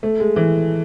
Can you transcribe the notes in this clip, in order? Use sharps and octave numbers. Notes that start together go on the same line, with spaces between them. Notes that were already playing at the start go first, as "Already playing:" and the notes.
A3
G#3
E3